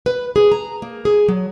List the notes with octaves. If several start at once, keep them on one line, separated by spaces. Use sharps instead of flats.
B4
G#4
A#5
A#3
G#4
F#3